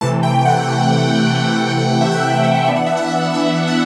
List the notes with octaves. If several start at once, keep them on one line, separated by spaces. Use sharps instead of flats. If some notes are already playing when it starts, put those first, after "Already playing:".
C3 E3 A3 A5
G5
G5
F#5
C3 E3 A3
C3 E3 A3
C3 E3 A3 E5
F#5
E5
F#5
E5
F#5
E3 B3 D4 E5
F#5
E5
F#5
E5
F#5
E3 B3 D4 E5
F#5